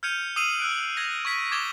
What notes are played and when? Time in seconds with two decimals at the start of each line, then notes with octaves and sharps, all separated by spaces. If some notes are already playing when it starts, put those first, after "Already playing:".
0.03 F6 G6 G#6 C#7 D#7 F7
0.36 D#6 E6 C7 D#7 F#7
0.59 E6 F#6 D7
0.97 G#6 A#6 F7
1.25 C#6 G#6 B6 D#7
1.51 D6 D#6 G#6 A6 E7 G7